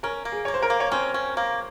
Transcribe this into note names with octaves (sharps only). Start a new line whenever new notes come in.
C#4 A#4
A#3
G#4
A#3 C#5
C5
A#4
A#3
C#5
C4 C#4 C5
C#4
A#3